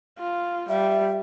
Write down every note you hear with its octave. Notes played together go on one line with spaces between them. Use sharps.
F4
G3 E5